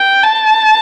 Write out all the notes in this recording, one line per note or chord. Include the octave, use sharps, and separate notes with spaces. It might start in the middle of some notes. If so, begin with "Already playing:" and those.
Already playing: G5
A5